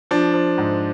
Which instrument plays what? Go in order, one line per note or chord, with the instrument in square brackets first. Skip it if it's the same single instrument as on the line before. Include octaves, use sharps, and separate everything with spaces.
[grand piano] F3 D4
F3
G#2